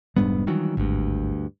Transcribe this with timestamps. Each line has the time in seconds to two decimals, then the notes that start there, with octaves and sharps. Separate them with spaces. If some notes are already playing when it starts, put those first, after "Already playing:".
0.16 F1 G#2 G3 G#3 B3 D4
0.47 D#3 E3 F#3
0.77 G#1 D2 G2